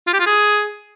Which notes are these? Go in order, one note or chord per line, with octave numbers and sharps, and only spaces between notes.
F4
G4
F4
G#4